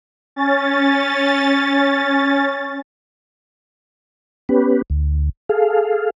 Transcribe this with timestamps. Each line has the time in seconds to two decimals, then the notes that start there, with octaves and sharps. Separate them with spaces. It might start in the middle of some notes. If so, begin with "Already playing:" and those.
0.36 C#4 A6
4.49 B3 C#4 G4 B4
4.90 D2
5.49 G#4 A4 F5